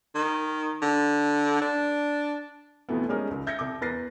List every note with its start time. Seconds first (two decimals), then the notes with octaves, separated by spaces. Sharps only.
0.15 D#3
0.82 D3
1.62 D4
2.89 F2 B2 E3 A3 B3
3.09 G3 G#3 C#4 D#4 G#4 A#4
3.31 C#2
3.47 E5 G6 G#6 A#6 C#7
3.59 C2 D6
3.81 E2 A#4 B4 A6 A#6 C7